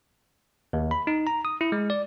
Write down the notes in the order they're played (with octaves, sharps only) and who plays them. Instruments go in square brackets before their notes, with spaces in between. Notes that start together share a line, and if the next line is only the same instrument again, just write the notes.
[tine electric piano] D#2
B5
D#4
A#5
D#6
E4
G#3
D5